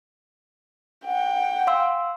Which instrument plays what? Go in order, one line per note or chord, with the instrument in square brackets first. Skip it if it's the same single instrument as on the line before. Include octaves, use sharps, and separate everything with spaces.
[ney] F#5 [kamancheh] G5
[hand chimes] F5 C6 E6